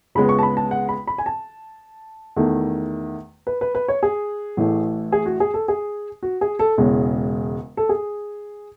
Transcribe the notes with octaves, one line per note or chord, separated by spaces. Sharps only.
C#2 C#3 G#3 B3 B5
C#6
A5
B5
A5
F#5
B5
B5
G#5
A5
E2 D#3 A3
B4
B4
B4
C#5
G#4
A1 A2 E3 A3
G#4
F#4
G#4
A4
G#4
F#4
G#4
A4
E1 E2 C#3 G#3
A4
G#4